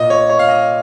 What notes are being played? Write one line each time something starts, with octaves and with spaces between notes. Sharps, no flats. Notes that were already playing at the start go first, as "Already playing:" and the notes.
Already playing: A#2 D#5
C#5
C#5
F5
D#5